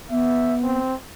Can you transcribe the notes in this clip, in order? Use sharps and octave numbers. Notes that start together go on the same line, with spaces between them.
B3 E5
C4